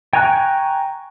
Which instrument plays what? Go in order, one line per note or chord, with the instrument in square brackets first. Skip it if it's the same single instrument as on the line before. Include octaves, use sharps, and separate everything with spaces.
[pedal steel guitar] G5 G#5 A#5 C#6 F#6